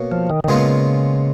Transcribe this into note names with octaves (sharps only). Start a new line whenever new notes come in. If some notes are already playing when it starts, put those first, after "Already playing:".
Already playing: B2 A#3 C#4
F3
D#3
D#3
A#2 C#3 G#3 B3 F4